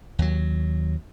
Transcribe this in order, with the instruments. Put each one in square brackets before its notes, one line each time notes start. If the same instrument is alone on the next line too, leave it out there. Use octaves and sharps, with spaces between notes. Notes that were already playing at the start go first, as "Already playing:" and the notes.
[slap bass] D#2 F#3